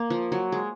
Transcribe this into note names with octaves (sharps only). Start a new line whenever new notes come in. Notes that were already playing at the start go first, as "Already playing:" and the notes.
Already playing: A#3
F3
F#3
G#3